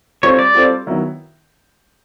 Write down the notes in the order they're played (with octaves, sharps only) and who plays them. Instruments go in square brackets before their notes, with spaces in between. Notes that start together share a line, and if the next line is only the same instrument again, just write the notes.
[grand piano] G3 C4 F4 A4 C5 [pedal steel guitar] C#5
[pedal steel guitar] D5
[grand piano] G3 C4 F4 A4 C5
D#3 F#3 B3 E4